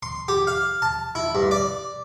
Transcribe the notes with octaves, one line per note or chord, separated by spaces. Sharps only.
C6
G4
F5
A5
E4
G2
D5